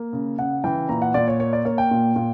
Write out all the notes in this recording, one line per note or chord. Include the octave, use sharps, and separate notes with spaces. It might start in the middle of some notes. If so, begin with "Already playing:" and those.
Already playing: A#3
C#3
C#3 F#5
E3 G5
A#2 A#5
F#5
A#2 D5
C#5
A#3 C#5
D5
A#3 C#5
G5
A#2
A#2